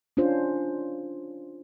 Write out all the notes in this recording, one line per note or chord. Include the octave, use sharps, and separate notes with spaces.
C#4 D4 F4 C5